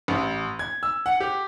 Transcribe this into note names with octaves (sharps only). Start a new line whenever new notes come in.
A1
G#6
E6
F#5
G4